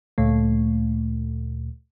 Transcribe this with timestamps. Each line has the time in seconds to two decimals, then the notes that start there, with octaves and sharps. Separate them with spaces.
0.18 D2 A#2 A3